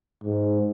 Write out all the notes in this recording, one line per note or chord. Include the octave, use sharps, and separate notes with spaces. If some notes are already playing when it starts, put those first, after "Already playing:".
G#2